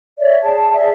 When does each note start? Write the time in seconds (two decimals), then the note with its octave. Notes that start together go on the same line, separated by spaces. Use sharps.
0.19 C#5 D5 E5
0.42 G#4 A5
0.73 G#4 D5 E5